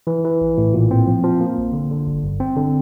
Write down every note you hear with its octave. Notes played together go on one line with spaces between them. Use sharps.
E3
E3
A#1
A2
A#2
C4
F3
F3
A#3
A#1
D3
D3
G1
G1
C4
D3